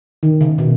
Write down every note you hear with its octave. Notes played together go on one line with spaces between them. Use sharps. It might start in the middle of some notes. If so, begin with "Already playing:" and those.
D#3
C#3
B2